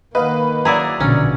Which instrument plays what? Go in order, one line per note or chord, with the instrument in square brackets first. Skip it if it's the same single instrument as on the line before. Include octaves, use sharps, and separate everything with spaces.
[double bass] D#3 A#3 [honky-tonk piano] B4 [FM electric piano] D#5 F5 F#5
[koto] F#3 E4 G#4 [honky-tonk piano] D5 A#5
[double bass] A#1 B2 [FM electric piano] D3 [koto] C#4